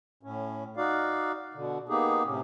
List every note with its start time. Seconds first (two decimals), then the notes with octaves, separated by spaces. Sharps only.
0.23 A2 C#4
0.77 D#4 F#4 D5 F5
1.54 B2 D3
1.89 A#3 B3 D#4 G4 G#4
2.25 A2 C3 C#4